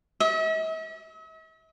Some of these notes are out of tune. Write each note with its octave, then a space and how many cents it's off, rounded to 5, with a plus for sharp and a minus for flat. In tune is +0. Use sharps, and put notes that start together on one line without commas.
E5 -45